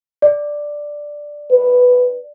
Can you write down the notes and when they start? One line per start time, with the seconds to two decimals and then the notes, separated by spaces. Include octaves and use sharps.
0.22 D5
1.51 B4